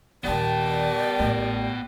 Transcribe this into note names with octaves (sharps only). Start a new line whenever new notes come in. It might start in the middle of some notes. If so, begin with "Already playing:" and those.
D#1 D#3 G3 B3 A#4 D5 G5 A5
A1 A3